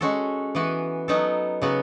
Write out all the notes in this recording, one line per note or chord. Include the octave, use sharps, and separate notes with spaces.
G#3 C#4 F#4 A4
E3 B3 F#4
F#3 B3 D#4 A4
C#3 F#3 B3 F#4